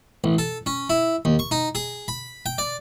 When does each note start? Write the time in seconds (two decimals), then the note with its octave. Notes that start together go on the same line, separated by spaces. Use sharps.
0.24 A1
0.38 A4
0.66 C#4
0.90 E4
1.25 D#2
1.39 C#6
1.51 D#4
1.75 G#4
2.08 B5
2.46 G5
2.58 D5